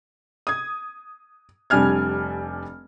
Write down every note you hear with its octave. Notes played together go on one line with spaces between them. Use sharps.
D#6 G#6
F1 G3 D4 G#5 F6 G#6